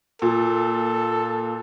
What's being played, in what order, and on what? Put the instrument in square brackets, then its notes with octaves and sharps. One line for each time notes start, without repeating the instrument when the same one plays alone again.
[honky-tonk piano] A#2 [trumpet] A4